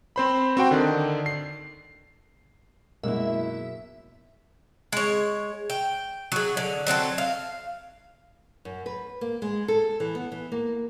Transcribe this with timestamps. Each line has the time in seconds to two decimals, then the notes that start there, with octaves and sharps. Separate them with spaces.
0.16 C4 C5 B5
0.57 C4 F#4 G5
0.71 D3 D#3 D4
1.26 C7
3.03 F#2 B2 F#3 G#3 A#3 E4 A#4 E5
4.92 G#3 C#5
5.70 G5
6.32 F#3 G#4
6.57 D3
6.87 F#3 C4 D#4 A4
7.18 F5
8.65 F#2
8.86 B4
9.21 A#3
9.42 G#3
9.68 A4
10.00 E3
10.15 B3
10.32 E3
10.52 A#3